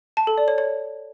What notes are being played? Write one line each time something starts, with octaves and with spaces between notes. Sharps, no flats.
A5
A4
D5
C#5
C#5